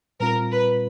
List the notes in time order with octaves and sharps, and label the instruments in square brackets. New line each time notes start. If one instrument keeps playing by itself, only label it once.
[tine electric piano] A#2 G3 C4 F4 [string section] A#4
[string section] B4